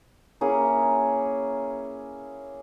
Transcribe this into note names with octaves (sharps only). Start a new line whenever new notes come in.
A#3 C#4 E4 G#4